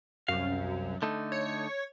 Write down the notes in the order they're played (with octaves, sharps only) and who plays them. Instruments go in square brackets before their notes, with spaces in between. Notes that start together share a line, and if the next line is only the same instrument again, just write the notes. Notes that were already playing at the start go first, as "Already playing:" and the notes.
[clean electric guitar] C2 F5 [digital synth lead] F#2
[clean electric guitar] D3 A3 D#4
[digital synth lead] C#5